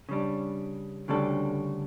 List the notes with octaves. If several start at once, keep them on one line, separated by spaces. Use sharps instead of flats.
C#3 G3 D4
D2 C#3 G3 D4 A4